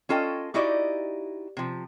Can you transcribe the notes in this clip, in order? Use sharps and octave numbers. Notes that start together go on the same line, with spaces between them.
C#4 F4 A4 D#5 G5
D#4 E4 F#4 G4 D5 D#5
C3 F3